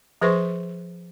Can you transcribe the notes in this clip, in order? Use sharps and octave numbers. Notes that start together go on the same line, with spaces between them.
F3 G#4 B4 C5 C6 C#6